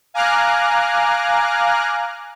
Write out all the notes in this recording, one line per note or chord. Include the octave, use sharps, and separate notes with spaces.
F5 G#5 A#5 D6 F6 F#6